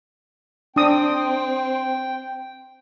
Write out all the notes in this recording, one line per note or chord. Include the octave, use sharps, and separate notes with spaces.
C4 D4 G5 D#6